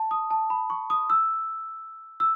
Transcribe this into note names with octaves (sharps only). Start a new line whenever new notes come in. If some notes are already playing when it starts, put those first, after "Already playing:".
Already playing: A5
D#6
A5
B5
C#6
D#6
E6
E6